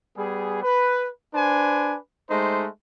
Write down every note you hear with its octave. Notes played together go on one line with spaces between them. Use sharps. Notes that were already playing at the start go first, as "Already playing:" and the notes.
G3 B3 G#4
B4
D4 B4 C5 G#5
G#3 A3 D#4 C5